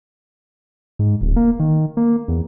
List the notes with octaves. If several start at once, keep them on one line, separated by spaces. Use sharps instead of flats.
G#2
D1
A#3
D#3
A#3
E2